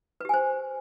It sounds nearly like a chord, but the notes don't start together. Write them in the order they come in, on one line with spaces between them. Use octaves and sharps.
B4 G4 G#5 C5